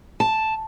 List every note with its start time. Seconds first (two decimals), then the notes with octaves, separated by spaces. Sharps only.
0.20 A5